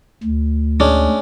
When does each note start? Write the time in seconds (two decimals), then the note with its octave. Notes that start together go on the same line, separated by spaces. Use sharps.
0.23 D2
0.80 G#3 C#4 D4